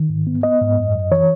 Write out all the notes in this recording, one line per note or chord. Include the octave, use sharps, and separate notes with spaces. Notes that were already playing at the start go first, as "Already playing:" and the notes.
Already playing: D#3
G#2
B3
B3 D#5
G#2
F#2
F#2
E3 C#5